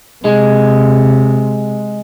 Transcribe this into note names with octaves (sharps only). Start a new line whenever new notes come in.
C3 G#3